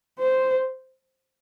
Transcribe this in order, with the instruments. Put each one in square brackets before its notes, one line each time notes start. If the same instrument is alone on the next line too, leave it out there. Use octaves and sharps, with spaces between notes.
[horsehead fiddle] C5